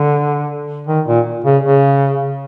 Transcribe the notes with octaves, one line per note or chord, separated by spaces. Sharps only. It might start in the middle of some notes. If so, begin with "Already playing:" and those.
Already playing: D3
D#3
A#2
C#3
C#3